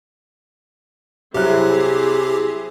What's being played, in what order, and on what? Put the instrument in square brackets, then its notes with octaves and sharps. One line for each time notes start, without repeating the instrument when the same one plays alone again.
[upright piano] C2 F#3 F#6 [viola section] C4 E4 G#4 [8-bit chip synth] G4